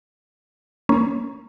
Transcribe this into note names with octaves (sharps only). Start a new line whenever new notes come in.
A#3 C#4